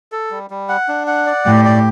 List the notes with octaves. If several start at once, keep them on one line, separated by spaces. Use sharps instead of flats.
A4
G3
G3
F#5
D4
F#5
D5
A2 G4
D5